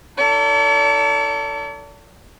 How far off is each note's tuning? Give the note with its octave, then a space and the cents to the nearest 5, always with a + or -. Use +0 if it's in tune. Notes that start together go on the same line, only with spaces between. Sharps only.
D#4 +25 A4 +25 D5 -45